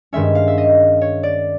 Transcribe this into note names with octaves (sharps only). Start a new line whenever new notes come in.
G2 D#3 G#3 C#4 E5
F5
E5
D#5
C#5
D5